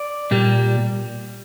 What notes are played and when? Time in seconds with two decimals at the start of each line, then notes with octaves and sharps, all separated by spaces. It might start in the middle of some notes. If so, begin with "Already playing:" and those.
Already playing: D5
0.31 A#2 G3 A#3